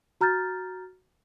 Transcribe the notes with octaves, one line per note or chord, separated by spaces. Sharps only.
F#4 A#5 F6 G6 A6